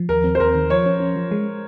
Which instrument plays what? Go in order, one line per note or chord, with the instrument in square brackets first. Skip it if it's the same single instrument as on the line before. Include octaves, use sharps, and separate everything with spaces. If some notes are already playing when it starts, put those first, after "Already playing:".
Already playing: [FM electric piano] F3
[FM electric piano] D#2 [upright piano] A#4
[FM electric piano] C4
[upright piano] C5
[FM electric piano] D#2 [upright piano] A#4
[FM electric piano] D#3
[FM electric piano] F3 [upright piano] C#5
[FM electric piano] C#4
C#4
F3
G#3